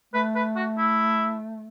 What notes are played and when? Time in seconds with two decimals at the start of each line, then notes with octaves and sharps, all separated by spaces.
0.14 A3 B4
0.35 B4
0.56 F#4
0.78 E4